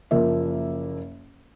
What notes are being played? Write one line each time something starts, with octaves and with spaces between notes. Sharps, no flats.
F#1 F3 A#3 E5